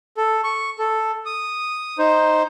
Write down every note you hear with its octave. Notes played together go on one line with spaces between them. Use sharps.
A4
C#6
A4
D#6
D#4 C5